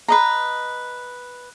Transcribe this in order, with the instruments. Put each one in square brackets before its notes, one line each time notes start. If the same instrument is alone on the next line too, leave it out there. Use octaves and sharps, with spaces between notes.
[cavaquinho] B4 D#5 A#5